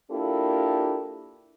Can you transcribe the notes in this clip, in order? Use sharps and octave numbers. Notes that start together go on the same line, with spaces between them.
A#3 D4 E4 F4 G4 A4